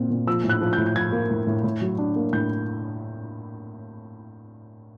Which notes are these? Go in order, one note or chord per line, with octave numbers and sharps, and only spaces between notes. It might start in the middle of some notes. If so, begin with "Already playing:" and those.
Already playing: A#2 C4
A#2
F3 E6
A2
F#6
F3
G6
A2
G6
F3 G#6
A#3
A2
A2
A2
F#3
D4
A#3
A2 G6